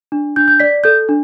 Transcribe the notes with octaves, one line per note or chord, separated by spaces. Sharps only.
D4
D4 G6
G6
D5 B6
A4 G6
D4